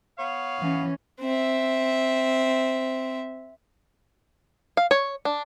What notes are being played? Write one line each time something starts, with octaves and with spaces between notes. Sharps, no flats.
B3 C#5 F5
E3 C#4
C4 E5
F5
C#5
D4